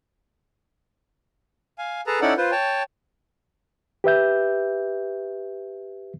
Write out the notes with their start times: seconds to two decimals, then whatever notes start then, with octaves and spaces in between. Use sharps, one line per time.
1.78 F5 G#5
2.07 G#4 A4 B4 A5 A#5
2.21 C#4 D#4 E4 A4 D5 F#5
2.37 F4 B4 C5
2.51 C#5 G5 A5
4.04 G4 B4 E5 G6